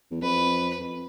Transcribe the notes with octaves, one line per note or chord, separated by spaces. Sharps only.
E2
F2 B4
F2